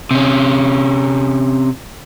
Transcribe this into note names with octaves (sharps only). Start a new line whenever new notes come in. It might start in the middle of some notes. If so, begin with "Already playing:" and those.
C3 C#4